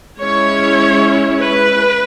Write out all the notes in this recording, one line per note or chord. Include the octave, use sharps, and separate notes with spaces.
G#3 C#4 E4 C#5
B4